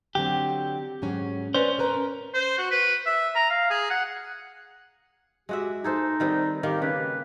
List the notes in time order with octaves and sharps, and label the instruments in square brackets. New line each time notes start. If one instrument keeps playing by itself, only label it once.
[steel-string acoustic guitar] D3 F#3 C4 [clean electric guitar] G4
[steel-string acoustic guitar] G#2 F#3 C#4
[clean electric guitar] C#4 C5 [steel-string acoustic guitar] B4 D5
[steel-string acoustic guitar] A#4 B4 A#5
[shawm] C5
F#4
B4
E5
A#5
F5
G#4
F#5
[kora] G#3 F#4 E5 [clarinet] G4
[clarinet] D#4 [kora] G#4 A4 C5
[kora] D#3 G3 C4
[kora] D#3 A#3 [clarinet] G4
[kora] C#3 [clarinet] B4